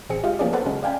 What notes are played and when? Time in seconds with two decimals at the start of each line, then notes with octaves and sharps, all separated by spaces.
0.10 A1 C4 G#4 C#7
0.23 G#3 F4 G4 D#5 F5
0.39 F3 A#3 B3 C#4 G#4 D5
0.53 A4 B4 C5 F#5 A5
0.66 C#3 F#3 G#3 C#4
0.83 D5 F5 G5 G#5 B5